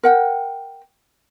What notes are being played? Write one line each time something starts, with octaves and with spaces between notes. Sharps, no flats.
A#4 F#5 G5